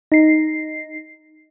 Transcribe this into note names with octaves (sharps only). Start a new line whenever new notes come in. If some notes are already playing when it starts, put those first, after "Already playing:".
D#4 C7